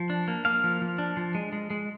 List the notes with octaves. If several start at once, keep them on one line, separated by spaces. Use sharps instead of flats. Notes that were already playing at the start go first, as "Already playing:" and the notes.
Already playing: F3
D4
A#3
A#3 F5
F3
F3
D4
F3
G#3
G#3
G#3